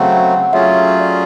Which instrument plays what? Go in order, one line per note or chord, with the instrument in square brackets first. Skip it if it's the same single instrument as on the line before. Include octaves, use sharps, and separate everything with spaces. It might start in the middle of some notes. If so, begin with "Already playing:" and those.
Already playing: [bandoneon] C#3 F#3 A3 C4 [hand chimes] F#5
[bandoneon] F#3 A3 C#4 F4 G#4 [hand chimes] E5
[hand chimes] D5